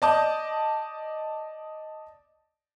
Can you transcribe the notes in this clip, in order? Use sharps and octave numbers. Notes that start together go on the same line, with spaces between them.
D5 D#5 A5 D6 D#6 G6